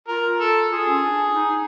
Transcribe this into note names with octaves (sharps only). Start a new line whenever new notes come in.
F4 A#4
A4
F4 G#4
C#4
D4
D#4